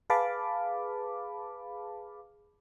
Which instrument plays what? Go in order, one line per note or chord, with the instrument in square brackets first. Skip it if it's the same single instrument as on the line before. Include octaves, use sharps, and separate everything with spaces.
[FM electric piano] G#4 B4 F5 A5 B5 D6